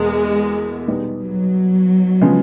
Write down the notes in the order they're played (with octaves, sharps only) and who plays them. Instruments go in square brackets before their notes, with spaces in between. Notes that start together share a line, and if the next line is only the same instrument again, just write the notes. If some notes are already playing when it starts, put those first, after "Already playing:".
Already playing: [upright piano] E2 B2 A#3 [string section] G#3
[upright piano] B2 G3 B3 D#4
[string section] F#3
[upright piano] C#3 F3 G#3 B3